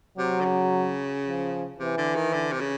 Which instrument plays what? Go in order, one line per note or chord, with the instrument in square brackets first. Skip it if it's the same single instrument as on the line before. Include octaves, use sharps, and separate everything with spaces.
[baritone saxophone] C3 [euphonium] F#3
[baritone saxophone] D3
C#3
[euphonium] F3
[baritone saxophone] C3 [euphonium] E3
[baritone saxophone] D3
D#3
D3
C3
C#3